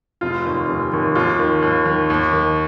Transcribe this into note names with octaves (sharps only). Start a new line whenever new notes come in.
F1 F4
D#2 D#3
F1
D#2 D#3
D#2 F4
D#3
D#2
D#3
D#2
D#3